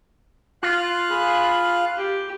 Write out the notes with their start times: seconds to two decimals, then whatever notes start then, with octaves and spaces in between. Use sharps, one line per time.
0.63 F4 F5 F#6
1.09 G#4 B5
1.97 G4